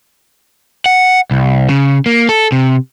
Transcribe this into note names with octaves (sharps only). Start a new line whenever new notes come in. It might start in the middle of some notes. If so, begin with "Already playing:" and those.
F#5
C2
C#3
A#3
A4
C3